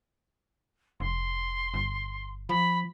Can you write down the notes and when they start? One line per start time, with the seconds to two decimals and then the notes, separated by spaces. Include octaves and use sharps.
1.00 F1 C6
1.74 G1
2.49 F3 B5